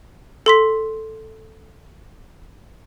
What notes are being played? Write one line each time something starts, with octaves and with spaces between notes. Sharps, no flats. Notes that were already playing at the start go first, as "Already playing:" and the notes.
A4 C6 B6